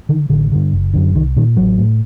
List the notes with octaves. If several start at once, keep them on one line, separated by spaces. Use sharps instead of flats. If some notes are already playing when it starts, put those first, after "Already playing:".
D3 D#3
A1 D3
G2 D3
F#1
F#2 D3
C2 D#3
A#2 D#3
A1 F#3
A2